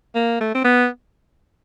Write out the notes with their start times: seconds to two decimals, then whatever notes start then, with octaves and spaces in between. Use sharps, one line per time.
0.15 A#3
0.41 A3
0.55 C4
0.65 B3